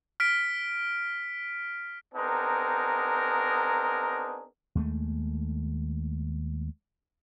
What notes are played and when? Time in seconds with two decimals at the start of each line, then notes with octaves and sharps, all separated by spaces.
0.20 F6 B6 D7
2.14 B3 C4 D4 D#4 G#4 A#4
4.75 D#2 G#3 A3